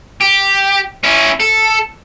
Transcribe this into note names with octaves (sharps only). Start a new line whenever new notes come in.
G4
C#4 E4
A4